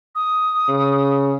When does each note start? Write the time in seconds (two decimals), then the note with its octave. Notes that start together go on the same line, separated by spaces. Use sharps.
0.15 D#6
0.69 C#3